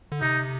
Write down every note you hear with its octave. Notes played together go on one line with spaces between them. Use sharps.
D3
C3 D#4